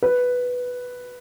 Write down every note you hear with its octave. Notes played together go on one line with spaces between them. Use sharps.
B4